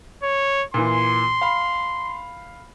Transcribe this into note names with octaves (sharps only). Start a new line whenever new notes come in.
C#5
A#2 E3 C6
F5 B5